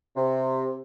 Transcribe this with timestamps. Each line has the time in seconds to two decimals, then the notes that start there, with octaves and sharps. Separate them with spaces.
0.16 C3